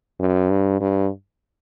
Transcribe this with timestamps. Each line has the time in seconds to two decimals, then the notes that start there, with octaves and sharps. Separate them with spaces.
0.20 F#2
0.50 G2
0.81 G2